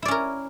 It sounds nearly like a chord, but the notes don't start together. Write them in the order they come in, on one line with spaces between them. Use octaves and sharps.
E4 D5 C#4 A#4